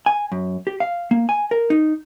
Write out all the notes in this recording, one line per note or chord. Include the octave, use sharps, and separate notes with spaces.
G#5
F#2
G4
F5
A#3
G#5
A#4
D#4